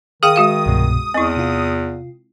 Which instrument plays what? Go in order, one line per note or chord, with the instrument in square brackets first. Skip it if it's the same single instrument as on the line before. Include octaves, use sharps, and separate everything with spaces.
[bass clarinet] D#3 [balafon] G#4 F5 G5 [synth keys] D#6
[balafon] G#3 F#4 F5
[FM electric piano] C2 G2 B2
[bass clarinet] E2 [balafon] C4 E4 [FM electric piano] D#5 C#6
[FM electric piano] C3 F4